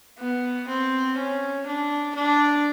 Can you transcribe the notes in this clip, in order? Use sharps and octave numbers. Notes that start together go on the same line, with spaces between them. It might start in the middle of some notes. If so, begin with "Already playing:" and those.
B3
C4
C#4
D4
D4